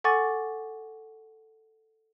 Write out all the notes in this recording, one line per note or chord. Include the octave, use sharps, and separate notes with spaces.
A4 F#5 G#5 C#6 D6 A6